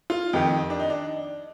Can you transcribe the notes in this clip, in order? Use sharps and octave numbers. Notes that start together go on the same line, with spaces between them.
F4
F2 D#3 G4
D4
D#4
D4